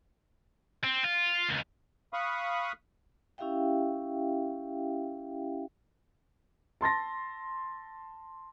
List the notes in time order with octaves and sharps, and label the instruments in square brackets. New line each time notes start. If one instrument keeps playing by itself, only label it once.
[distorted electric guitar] C4
F4
C#2 D#3
[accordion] F5 B5 C#6 D#6 F#6
[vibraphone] C#4 E4 G4 E5 F5 G5
[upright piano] A5 C6 A6 A#6